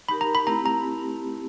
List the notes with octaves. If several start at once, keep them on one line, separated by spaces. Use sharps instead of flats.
D#4 G4 A#4 B5
A#5
B5
A3 C4 E4 G4 A#5
A#5